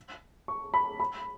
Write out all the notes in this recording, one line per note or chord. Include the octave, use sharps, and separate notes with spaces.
C#6
B5
B5